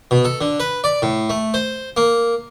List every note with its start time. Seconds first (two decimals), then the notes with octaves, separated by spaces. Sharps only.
0.11 B2
0.25 A4
0.41 D3
0.60 B4
0.84 D5
1.02 A2
1.30 A3
1.54 C5
1.97 A#3